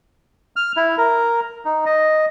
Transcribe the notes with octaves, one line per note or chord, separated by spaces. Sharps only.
F6
E4
A#4
D#4
D#5